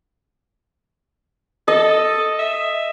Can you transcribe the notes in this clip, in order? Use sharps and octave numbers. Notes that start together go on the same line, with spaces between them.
A4 D#5
E5